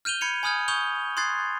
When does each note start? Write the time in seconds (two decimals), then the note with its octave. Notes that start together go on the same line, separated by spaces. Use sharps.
0.05 F6 G6 D#7 F7 G7
0.21 B5 G#6 C#7 D#7 F7
0.43 G#5 B5 D#6 F6 G6 G#6
0.68 C#6 D#6 G6 F7 G7
1.17 C6 D#6 F#6 G#6 A6 C7